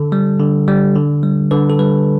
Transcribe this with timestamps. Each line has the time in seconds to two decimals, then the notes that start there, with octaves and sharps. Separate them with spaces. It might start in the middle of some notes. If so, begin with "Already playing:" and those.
Already playing: D3 A4
0.12 G3
0.39 D3
0.68 G3
0.95 D3
1.23 G3
1.51 D3 B4
1.70 A4
1.79 G3 B4